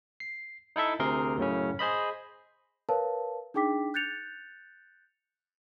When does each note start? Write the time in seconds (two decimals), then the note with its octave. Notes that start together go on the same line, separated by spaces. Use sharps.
0.20 C7
0.76 D#4 E4 A4 E5
0.99 D2 C3 G#4 A#4 C6
1.38 F#2 A2 C#3 C#4
1.79 G#4 C5 D#5 B5
2.89 A#4 B4 C#5 F5 A5
3.54 D4 D#4 G#4 G5 D6 B6
3.94 F#6 G6 A6 C#7 F7